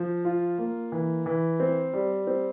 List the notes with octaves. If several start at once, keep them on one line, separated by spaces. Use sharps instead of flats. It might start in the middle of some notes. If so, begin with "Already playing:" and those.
Already playing: F3
F4
A#3
E3
E3
C4
G3
C4